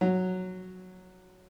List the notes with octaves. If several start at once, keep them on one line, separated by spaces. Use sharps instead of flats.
F#3